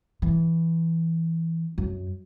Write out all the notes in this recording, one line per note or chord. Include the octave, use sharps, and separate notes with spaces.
E3
F#2